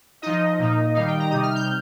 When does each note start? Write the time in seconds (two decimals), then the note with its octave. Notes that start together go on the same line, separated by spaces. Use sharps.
0.22 F3 D#4 D#5
0.59 A#2 A#3 D#4
0.94 D#3 G3 D#4 F5
1.07 G5
1.19 A#5
1.31 C3 G3 D#4 D#6
1.43 F6
1.55 G6